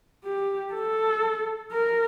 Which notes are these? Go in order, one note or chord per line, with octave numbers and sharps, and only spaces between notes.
G4
A4
A#4